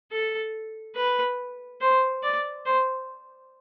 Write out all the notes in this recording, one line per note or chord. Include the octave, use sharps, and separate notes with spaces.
A4
B4
C5
D5
C5